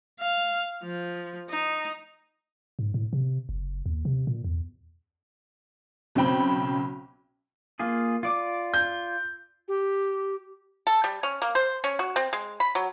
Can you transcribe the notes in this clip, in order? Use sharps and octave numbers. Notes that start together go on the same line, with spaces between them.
F5
F3
D#4
G#2
A2
C3
F#1
D#2
C3
A#2
E2
B1 C#3 C4 G5 B5
A#3 F4 G#4
F4 D5 D6
G6
G4
A4
G3
C#4
A#3
C5
C#4
F#4
C4
G#3
B5
F#3